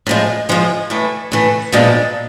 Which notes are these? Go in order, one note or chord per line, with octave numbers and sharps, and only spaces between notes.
A2 F3 G#3
A2 F3 G#3
A2 E3 A3
A2 E3 A3
A#2 F3 G#3 B3 D4